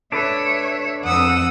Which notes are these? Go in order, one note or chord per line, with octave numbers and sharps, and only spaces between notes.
D4 A4 B4 C#5 E5
F2 C4 F#5 D#6 E6